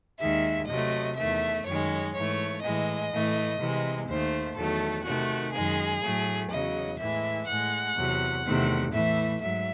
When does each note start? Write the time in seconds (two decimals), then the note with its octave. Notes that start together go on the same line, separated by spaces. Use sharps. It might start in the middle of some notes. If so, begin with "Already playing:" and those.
0.20 D#2 D#3 G#3 E5
0.67 C3 F#3 A3 D#5
1.16 E2 D#3 A3 E5
1.64 F#2 D#3 G#3 C#5
2.13 G#2 E3 A3 C#5
2.62 A2 E3 G#3 D#5
3.11 A2 E3 A3
3.60 C3 E3 G#3
4.07 D#2 D#3 A3 C5
4.55 E2 D#3 F#3 A3 A4
5.04 C3 D#3 A3 F#4
5.52 F#2 D#3 G#3 G#4
6.02 A2 F#3 A3
6.50 E2 C#3 F#3 D#5
6.98 A2 E3 G#3 E5
7.46 A2 G#3 F#5
7.95 E2 C3 F#3
8.44 E2 C3 D#3 A3
8.92 A2 E3 A3 E5
9.40 G#2 F#3 E5